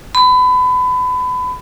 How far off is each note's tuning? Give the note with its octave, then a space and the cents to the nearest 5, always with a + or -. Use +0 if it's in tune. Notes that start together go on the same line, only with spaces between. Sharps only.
B5 +30